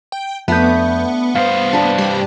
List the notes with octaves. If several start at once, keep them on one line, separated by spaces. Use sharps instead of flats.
G5
F2 A3 B3 D4 B4 G6
G2 C5 F5
D4 B4
G3